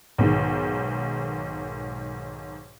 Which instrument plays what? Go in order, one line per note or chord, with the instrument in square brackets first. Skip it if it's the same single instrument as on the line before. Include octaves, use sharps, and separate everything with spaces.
[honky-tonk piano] B1 G#2 D#3